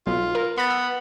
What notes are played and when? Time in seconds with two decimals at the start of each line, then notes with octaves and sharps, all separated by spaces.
0.07 B1 F4
0.35 A#4
0.58 B3 B5 A6
0.70 E6